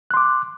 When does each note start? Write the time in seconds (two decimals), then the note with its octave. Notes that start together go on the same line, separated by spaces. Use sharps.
0.11 F#6
0.14 C6
0.17 D6